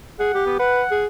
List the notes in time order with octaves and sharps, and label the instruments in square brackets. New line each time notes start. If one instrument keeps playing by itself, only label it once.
[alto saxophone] G#4 [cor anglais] F#5
[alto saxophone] G4
[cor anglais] B3
[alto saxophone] B4 [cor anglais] F#5
[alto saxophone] G#4